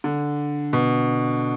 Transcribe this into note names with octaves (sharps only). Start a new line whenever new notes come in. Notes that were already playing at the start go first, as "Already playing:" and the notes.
D3
B2